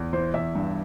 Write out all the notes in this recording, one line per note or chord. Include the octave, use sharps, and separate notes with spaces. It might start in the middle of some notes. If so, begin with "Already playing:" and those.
Already playing: E2
E3 C5
E2 E5
G2